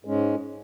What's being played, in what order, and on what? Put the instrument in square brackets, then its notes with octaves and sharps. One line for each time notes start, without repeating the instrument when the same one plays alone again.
[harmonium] G#2 G#3 C#4